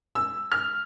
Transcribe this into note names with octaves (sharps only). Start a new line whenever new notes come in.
E6
F6